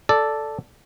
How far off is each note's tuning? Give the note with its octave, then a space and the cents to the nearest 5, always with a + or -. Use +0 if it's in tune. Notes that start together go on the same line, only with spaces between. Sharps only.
A4 +0 D5 +0